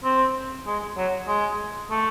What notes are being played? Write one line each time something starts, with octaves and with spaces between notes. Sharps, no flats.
C4
G#3
F#3
G#3
A3